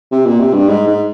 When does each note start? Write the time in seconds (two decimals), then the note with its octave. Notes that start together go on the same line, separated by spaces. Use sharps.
0.11 C3
0.26 A#2
0.40 C3
0.54 G2
0.68 G#2
0.87 G#2